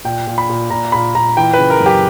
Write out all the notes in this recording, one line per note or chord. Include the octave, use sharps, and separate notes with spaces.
A#2 G5
A#2
B5
A#2
A#2 A#5
A#2 B5
A#2 A#5
E3 G5
B4
C#3
A#4
F#2
G4